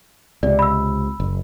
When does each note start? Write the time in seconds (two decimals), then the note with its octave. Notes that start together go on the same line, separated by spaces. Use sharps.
0.43 C#2 C3 D5
0.59 B5 E6
1.20 F#1